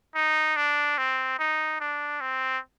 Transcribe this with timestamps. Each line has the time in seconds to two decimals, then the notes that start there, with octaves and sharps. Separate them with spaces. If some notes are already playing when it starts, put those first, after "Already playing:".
0.15 D#4
0.56 D4
0.98 C4
1.39 D#4
1.81 D4
2.21 C4